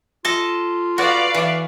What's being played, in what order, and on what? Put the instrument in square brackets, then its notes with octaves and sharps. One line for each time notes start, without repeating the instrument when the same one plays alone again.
[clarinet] F4 [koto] A4 D#5 A5
[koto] F#4 [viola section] B4 D5 F5
[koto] E3